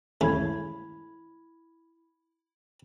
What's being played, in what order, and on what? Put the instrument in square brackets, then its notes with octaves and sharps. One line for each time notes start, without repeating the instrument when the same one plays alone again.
[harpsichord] G#3 A3 C#4 [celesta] E4 B5 G#6